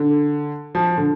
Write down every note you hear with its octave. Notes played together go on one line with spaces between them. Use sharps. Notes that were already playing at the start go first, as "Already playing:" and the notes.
Already playing: D3
F3
D3